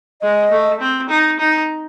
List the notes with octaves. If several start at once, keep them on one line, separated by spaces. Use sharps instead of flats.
G#3 D#5
A3
C4
D#4
D#4